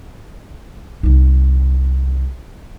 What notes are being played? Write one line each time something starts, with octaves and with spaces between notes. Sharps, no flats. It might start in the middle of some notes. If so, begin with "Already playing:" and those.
C2 D#4